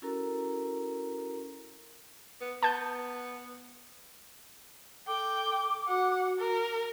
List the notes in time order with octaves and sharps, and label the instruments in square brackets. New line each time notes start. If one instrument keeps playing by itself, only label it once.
[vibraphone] C#4 E4 F#4 A4 A#4 A#5
[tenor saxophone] B3
[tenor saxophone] B3 [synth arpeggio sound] A5 G6
[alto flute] A4 [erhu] G5 [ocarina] D6
[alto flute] F#4 [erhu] F#5
[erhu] A#4